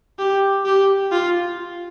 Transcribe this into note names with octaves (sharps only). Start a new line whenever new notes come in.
G4
G4
F4